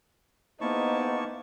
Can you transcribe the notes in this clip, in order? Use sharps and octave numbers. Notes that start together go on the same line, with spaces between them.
A#3 B3 D#4 E4 G#4 C5 A5 C#6